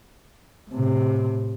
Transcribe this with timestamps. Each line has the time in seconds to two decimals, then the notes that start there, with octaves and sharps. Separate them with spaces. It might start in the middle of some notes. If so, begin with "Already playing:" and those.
0.70 A2 C3